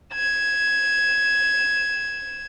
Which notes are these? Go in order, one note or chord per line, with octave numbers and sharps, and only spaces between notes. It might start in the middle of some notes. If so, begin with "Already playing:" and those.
G#6 E7